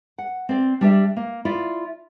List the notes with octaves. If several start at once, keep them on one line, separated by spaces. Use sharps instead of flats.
F#5
C4 D5
G3 D4 G4 D5 E5
A#3
E4 F4 D5